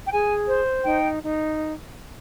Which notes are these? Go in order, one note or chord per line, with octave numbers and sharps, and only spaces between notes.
G5
G#4 G#5
C5
D#4 G5
D#4